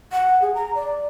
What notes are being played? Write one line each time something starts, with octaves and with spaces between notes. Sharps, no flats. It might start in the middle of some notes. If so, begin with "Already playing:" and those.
F#5
G#4
A#5
D5